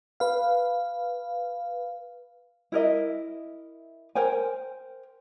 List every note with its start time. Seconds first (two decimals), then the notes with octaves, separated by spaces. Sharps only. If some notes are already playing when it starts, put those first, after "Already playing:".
0.20 B4 F5
2.72 E4 A#4 D#5 E5
4.15 A#4 C5 G5 G#5